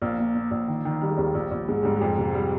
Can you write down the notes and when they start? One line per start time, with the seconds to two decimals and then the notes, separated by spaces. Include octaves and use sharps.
0.02 A#1 A#3
0.18 A#2
0.35 A#2
0.51 A#1
0.68 D#3
0.85 D#3
1.01 D#3 G3
1.10 G#3
1.18 D#2 G3
1.34 A#1
1.51 A#1
1.68 G#2 G#3
1.83 G#2 G3
1.96 G#3
2.02 F2
2.18 C3
2.34 G3